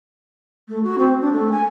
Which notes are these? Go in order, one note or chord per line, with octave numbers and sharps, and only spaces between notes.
A3
F#4
C4
D4
A3
G#5